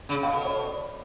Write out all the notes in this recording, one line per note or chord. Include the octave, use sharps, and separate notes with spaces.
C#3
B2 F5
A4
C#5
C#5
D5